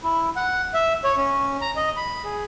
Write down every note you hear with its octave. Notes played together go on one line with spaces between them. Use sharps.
E4
F#5
E5
C#5
C#4
A#5
D#5
B5
G#4